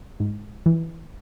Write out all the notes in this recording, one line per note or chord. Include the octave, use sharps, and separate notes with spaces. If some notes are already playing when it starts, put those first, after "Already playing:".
G#2
E3